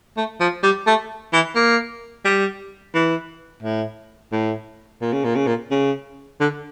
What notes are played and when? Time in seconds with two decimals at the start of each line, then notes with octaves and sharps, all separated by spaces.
0.17 A3
0.41 F3
0.63 G3
0.87 A3
1.33 E3
1.56 A#3
2.25 G3
2.94 E3
3.63 A2
4.32 A2
5.01 A#2
5.13 C#3
5.24 A#2
5.35 C#3
5.47 A#2
5.71 C#3
6.40 D3